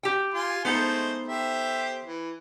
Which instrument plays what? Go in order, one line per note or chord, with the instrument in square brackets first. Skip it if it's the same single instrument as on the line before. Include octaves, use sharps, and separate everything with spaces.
[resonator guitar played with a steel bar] G4 G5
[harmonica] F4 G#5 C6
[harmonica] G#3 A3 C5 [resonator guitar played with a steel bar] B3 D#4 A4
[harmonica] G4 C5 E5
E3